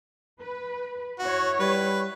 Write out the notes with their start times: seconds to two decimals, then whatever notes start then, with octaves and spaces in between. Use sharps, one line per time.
0.41 B4
1.19 E4 F#4 C#5
1.60 G3 B4